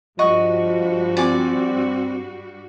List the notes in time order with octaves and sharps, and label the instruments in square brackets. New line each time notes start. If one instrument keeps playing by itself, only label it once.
[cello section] G2 G3 F#4 [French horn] F3 [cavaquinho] D#5 F#5 C#6
[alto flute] C4 [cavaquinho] D5 G#5 D6